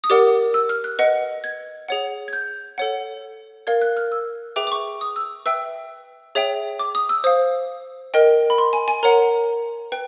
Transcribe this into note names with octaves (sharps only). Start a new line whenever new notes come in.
D#6
G4 A#4 D5 F#5 D6
E6
F6
F#6
B4 D#5 F#5
G#6
G#4 C#5 F#5
G#6
G6
A4 C#5 F#5
A#4 D5 F5 G#6
F#6
F6
E6
G#4 B4 E5 G5 D6
D6
C#6
D#6
E6
B4 E5 G5 E6
G#4 C#5 E5 G5
D6
D#6
E6
C5 F5 D#6
A#4 D#5 G5
B5
C6
G#5
G#5
A#4 C#5 F#5 A#5
B4 G5